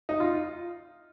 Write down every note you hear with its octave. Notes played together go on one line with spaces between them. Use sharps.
D#4
F4